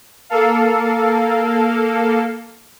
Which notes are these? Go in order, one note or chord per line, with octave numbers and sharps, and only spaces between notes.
A#3 A4 F5